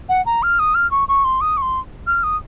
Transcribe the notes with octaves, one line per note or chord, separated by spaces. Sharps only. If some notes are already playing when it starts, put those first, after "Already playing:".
F#5
A#5
F6
D#6
F6
C#6
C#6
C6
D#6
C#6
C6
F6
D#6